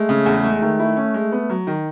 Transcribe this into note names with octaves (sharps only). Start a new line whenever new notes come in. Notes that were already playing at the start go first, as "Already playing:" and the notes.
Already playing: G#3 A3
C#3
E2
G#3
D#3
E4
C#4
G#3
B3
F#3
D#3